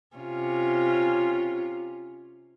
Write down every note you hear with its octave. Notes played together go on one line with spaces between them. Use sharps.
C3 C#4 F4